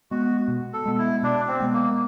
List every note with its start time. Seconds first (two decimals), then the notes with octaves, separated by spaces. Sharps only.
0.11 G#3 B3 F#4
0.48 B2
0.73 A4
0.86 G#3 B3
0.99 E4
1.23 B2 D4
1.48 C4
1.60 G#3 B3
1.73 A#3